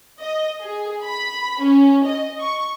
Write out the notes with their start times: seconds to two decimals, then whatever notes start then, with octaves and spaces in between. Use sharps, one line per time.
0.21 D#5
0.62 G#4
1.04 B5
1.63 C#4
2.06 D#5
2.41 C#6